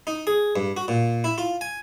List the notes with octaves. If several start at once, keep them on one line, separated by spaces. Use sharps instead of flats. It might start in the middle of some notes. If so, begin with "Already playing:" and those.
D#4
G#4
G2
F#4
A#2
E4
F4
G#5